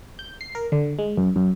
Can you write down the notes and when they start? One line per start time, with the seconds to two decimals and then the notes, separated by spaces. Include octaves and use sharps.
0.19 G6
0.41 C7
0.55 A#4
0.72 D3
0.99 G#3
1.17 F#2
1.36 F#2